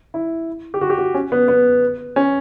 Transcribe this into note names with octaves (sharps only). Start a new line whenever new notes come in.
E4
G4
F#4
G4
F#4
C#4
B3
B3
C#4